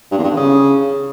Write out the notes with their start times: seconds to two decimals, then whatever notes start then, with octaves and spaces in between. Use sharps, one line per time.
0.11 G2
0.18 E2
0.24 G2
0.30 D3
0.37 C#3